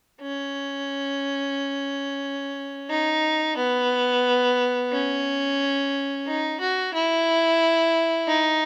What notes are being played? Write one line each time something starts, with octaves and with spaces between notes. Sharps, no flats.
C#4
D#4
B3
C#4
D#4
F#4
E4
D#4